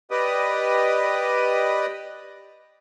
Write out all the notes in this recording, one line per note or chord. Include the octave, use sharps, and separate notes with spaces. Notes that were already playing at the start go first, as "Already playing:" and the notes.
G4 B4 D5 D#5 D#6